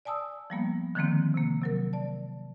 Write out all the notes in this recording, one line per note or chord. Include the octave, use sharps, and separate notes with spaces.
D5 G#5 A5 D#6 E6
F3 G3 A#3 B3
D3 D#3 F3 G#3 A#3 C4
C3 A#3
C3 F#3 A#4
D5 A5